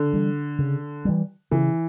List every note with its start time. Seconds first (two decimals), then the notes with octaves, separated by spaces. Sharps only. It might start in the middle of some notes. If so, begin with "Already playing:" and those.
Already playing: D3
0.13 E3 G3
0.59 C#3
1.05 E3 G3
1.51 C#3 E3